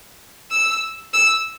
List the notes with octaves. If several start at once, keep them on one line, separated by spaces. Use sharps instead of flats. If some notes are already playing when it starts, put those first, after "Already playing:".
E6
E6